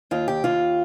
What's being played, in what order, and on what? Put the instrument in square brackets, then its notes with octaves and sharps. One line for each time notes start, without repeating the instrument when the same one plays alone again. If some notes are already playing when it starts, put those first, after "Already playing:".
[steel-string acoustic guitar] D#2 F4
G4
D#2 F4